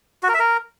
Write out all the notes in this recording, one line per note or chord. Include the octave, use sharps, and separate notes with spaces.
F#4
A#4
E5
A#4